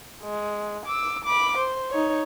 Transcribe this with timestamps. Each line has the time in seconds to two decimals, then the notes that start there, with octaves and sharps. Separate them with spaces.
0.23 G#3
0.86 D6 E6
1.24 B5 D6
1.57 C5
1.91 D#4 C#5